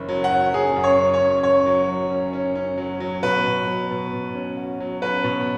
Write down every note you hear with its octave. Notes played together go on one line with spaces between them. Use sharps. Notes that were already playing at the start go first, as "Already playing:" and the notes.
Already playing: F#1 C#4
F#3
F#5
F#3
C#4 G#4
F#2
C#5
C#4
C#5
F#2
F#2 C#5
F#3
F#3
C#4
C#4
C#4
F#3
F#3
B2 B4
B2
F#3
B2
B2
C#4
F#4
F#3
C#4 B4
B2